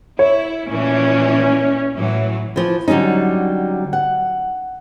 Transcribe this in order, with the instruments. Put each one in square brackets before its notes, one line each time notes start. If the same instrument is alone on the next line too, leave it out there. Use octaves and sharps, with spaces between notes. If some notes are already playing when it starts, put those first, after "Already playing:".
[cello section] E4 [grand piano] C#5
[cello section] A#2 E3 A3 [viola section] C#4
[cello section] A2 E3 F#3
[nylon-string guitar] E3 F3
D3 F#3 G3 C#4 D#4
F#5